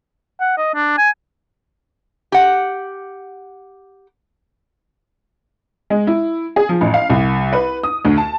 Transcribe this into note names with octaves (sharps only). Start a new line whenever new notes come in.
F#5
D#5
D4
G#5
G4 F#5
G#3
E4
G#4
F3
A1
F5
C2
B4
D#6
D2
A5